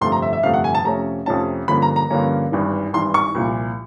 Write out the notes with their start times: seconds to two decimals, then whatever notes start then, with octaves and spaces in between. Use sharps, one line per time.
0.01 G1 F2 C3 F3 A3 C6
0.12 A#5
0.22 E5
0.33 E5
0.43 G1 F2 C3 F3 A3 F5
0.54 F#5
0.64 G#5
0.75 A5
0.85 F2 C3 F3 A3 C#4 A#5
1.26 F2 C3 F3 A3 C#4 A5
1.68 G2 D3 F3 A#3 C#4 B5
1.82 A#5
1.96 A#5
2.10 G2 D3 F3 A#3 C#4
2.52 G#1 G2 E3
2.93 G#1 G2 E3 C6
3.14 C#6
3.35 C2 A#2 F3